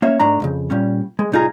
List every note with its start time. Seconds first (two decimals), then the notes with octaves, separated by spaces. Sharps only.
0.02 A#3 C#4 C#5 E5
0.19 G#2 A3 D4 A#5
0.40 C2 F2 C#3
0.70 A#2 G3 C#4
1.19 G#3
1.32 C2 A2 D#4 F4 G#4 A#5